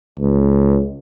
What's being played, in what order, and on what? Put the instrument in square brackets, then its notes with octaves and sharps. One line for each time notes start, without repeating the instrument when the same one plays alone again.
[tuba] C#2